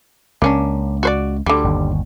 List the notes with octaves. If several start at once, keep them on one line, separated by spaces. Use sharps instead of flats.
C#2 A#3 C#4 D4
F#4 C5 D5
D2 D3 G3
G1 D#2